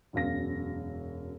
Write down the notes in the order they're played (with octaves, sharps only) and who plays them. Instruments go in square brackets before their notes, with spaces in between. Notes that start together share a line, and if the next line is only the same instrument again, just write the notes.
[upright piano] E1 F#2 F5 A#6